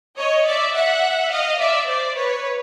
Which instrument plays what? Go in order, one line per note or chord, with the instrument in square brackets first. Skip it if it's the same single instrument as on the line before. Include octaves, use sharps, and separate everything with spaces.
[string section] C#5 D#5
D5 E5
E5 F#5
D#5 F5
D5 E5
C5 D5
B4 C#5